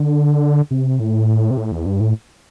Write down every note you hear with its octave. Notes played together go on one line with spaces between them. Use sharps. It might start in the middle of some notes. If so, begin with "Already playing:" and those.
Already playing: D3
C3
A2
C3
A2
E2
G2
A2